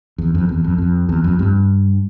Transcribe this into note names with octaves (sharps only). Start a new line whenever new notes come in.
E2
F2
E2
F2
F2
E2
F2
G2